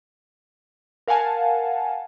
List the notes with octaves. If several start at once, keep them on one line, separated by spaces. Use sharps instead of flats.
A#4 F5 F#5 G#5 A5